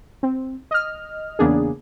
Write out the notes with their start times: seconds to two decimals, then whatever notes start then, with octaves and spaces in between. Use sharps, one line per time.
0.23 C4
0.71 D#5 F6
1.39 E2 C#3 A#3 B3 D4 G#4